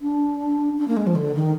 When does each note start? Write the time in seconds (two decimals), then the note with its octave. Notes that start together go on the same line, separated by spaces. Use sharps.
0.01 D4
0.78 D4
0.88 A#3
0.97 G#3
1.07 F3
1.15 D3
1.35 D#3